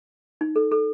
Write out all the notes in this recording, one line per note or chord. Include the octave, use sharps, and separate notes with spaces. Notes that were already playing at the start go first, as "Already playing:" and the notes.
D#4
A4
A4